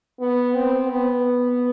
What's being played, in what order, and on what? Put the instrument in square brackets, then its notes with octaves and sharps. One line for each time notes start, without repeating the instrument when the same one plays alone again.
[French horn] B3
C4
B3